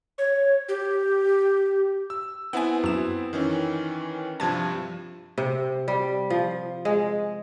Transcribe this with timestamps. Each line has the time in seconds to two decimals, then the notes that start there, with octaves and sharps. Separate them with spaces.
0.18 C#5
0.69 G4
2.10 E6
2.53 B3 C4 E4 F#5 G#5
2.84 F#2 E7
3.33 D#3 E3 C#4
4.40 G2 C3 F3 A5 G#6
5.38 C3
5.88 G3
6.30 F3
6.85 G#3